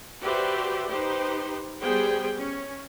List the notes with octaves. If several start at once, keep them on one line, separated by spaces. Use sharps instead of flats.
F#4 G4 B4 C5 D5 E5
D#4 G4 B4 C5
G3 B3 G4 G#4 C5 G5
C#4